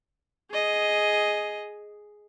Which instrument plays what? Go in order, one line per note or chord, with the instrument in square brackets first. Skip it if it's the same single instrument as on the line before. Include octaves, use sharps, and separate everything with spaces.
[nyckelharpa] G#4 D#5